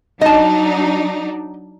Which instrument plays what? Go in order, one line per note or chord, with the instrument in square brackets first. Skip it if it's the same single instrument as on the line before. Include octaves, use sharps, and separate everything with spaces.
[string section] F#3 D4 D#4 [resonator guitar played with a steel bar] D#5 A5